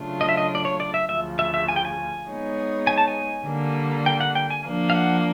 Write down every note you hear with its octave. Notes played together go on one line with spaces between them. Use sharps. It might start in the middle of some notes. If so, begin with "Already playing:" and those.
Already playing: C#3 F#3 A3 D4 F4
D#5
E5
D#5
D5
C#5
D5
E5
D2 C#3 F3 E5
E5
E5
G#5
G5
G#5
G#3 B3 D#4 G#4 C#5
G#5
A5
G#5
D3 G3 A#3
G5
F#5
G5
G#5
F3 A#3 D4
F5
F#5